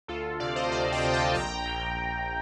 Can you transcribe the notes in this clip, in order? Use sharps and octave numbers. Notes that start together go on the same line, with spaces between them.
D2 F4 A4
C3 D5 F5
C5 D#5
D2 D5 F5
D#5 G5
C3
F5 A5
A#1 G5 A#5
A#1
A#1